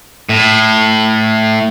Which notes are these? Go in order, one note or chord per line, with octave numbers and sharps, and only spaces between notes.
A2